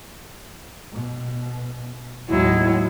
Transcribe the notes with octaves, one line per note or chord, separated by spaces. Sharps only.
B2
D#2 A2 F#3 G#3 E4